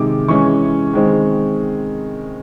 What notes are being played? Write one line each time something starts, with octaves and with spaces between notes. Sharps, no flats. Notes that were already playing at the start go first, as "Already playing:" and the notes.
Already playing: C3 D#3 G#3 D6
E3 G#3 C#4 C#6
D#3 G#3 C4